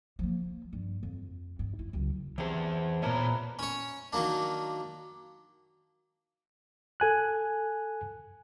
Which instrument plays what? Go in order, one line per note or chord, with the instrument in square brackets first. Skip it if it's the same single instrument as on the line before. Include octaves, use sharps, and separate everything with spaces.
[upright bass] F3 A#3
G2
F2
G2
E4
C#2 F#2
[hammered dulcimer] C3 A5 [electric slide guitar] E3 G#4 B4
[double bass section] A#2 [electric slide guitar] B3 C#5 A5 [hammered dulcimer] E4 A#4 B4
[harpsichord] C#4 C#5
D#3 F#3 A#3 D4
[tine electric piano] A4 G#5 F#6